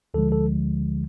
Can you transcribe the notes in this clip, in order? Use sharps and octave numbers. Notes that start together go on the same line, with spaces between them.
D2 D3 F3 G#3 A4
A4